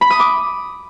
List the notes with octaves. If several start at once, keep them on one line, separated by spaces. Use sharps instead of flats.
B5
D#6
D6